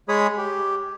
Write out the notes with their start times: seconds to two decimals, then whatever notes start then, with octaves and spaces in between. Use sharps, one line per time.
0.09 G#3 G#4 C#5 B5 D#6
0.38 G4